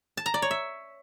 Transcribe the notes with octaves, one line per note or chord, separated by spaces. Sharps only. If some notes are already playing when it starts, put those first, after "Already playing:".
A5
A#5
D5
C#5
E5